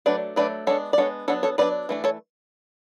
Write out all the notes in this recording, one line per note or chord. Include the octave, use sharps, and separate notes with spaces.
F#3 A3 D4 B4 D5
F#3 A3 D4 B4 D5
G#3 B3 D4 A4 C#5
D5
G#3 B3 D4 A4 C#5
F#3 B3 D4 A4 C#5
A4 C#5
F#3 B3 D4 B4 D5
E3 A3 D4
A4 C#5